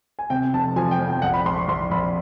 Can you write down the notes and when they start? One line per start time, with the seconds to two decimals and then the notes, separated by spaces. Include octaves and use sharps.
0.19 G#5
0.30 C3 G5
0.54 F1 A5
0.76 F3 G#5
0.91 G5
0.99 F2
1.08 G5
1.22 A#1 F#5
1.34 B5
1.45 A#1 C6
1.58 C#6
1.68 A#1 C6
1.91 A#1 B5